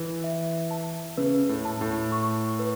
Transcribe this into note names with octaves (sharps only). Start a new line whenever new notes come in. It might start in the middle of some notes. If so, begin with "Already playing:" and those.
Already playing: E3 B4
E5
A5
C#3 B4
A2
A5
A2
C#6
B4